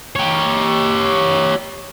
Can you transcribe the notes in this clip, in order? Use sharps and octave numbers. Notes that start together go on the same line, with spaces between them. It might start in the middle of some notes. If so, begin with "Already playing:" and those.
G4 C#5